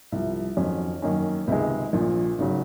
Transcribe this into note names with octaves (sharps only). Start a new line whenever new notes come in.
C2 C3 F3
F2 D#3 F#3 C#4
F#2 D#3 A#3 C#4
C#2 C3 D#3 G#3
A#1 A#2 F3
G#1 C#3 F#3